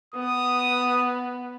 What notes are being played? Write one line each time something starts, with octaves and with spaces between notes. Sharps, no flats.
B3 D#6